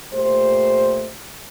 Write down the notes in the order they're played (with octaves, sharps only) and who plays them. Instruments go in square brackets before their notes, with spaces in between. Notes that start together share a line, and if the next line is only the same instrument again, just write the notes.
[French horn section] A#2 A3 G4 C5